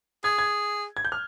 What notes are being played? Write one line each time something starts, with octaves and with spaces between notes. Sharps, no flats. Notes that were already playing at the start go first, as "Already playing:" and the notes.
G#4 G#6
G#6
G#6
G6
F6